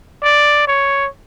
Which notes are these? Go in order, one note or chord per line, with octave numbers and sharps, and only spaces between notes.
D5
C#5